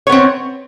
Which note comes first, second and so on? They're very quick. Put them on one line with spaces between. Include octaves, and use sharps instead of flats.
C#5 B3 C4